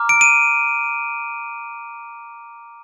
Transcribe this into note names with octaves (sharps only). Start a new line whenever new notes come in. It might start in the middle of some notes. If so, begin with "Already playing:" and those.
Already playing: A#5 D6 F6
D7
D#7